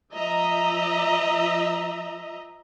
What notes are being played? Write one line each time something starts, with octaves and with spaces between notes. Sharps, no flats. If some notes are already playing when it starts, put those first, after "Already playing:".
F3 D#5 E5 A#5